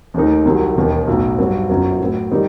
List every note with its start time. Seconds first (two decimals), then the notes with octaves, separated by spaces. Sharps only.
0.14 D#2 D#3 A3 C4 D#4
0.45 C2 C3 D#3 F#3
0.76 E1 D#2 D#3
1.07 B1 A2 F#3
1.39 G2 F#3 C4
1.70 G1 F#2 F#3 C4
2.00 A2 F#3 C4
2.31 D#3 G3 C4 D#4